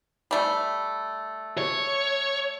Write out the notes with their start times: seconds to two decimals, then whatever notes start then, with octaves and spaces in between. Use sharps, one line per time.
0.31 G3 A3
1.58 C#5